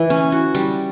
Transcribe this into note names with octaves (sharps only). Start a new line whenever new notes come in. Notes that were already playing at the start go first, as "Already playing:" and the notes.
Already playing: E3
C#4
F#4
G3